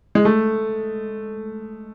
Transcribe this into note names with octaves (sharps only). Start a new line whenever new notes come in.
G#3
A3